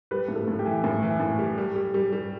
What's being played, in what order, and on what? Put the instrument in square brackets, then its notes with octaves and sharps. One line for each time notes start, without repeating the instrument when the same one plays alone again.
[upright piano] G3 B4
A2
A4
A2
G4
E3
A2
E3
A2
G3
G3
G3
G3
G3